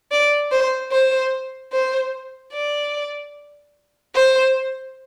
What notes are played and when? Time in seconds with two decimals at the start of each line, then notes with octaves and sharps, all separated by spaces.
0.12 D5
0.52 C5
0.92 C5
1.73 C5
2.53 D5
4.15 C5